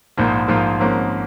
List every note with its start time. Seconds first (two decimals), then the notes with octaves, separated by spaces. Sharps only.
0.17 A#1 G#2 F3 A#3 F4
0.48 A#1 G#2 F3 A#3 F4
0.80 G#1 G#2 F3 A#3 C#4